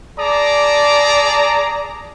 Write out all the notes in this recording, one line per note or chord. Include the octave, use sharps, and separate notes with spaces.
G#4 D5 A5 A#5 D6